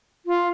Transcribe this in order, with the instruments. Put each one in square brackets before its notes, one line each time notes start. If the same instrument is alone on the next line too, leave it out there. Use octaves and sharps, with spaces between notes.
[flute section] F4